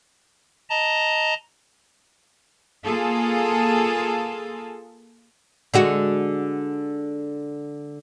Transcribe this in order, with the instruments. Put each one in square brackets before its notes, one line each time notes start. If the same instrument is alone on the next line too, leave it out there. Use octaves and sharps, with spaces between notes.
[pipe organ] D#5 A5 A#5
[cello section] A#3 F4 G#4 A4
[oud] D3 G#3 F#4